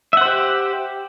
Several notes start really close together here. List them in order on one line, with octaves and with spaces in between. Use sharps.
E5 F#5 C5 G4